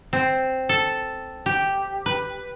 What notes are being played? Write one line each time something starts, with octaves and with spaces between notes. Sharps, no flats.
C4
A4
G4
B4